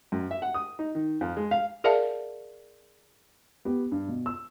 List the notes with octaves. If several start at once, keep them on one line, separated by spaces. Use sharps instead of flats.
F#2
E5
F#5
D#6
D#4
D#3
F2
G#3
F5
G#4 A#4 D5 E5 F5 A5
B3 G4
G2
B2
E6